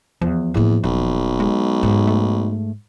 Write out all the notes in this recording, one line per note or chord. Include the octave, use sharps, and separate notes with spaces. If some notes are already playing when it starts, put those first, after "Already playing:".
E2 F3
E2 A2 A#3
D#1 B1
G#3
G#2
A3